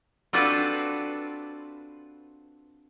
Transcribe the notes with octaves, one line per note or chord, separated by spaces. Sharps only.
C4 D4 F4 F#4 A4 B4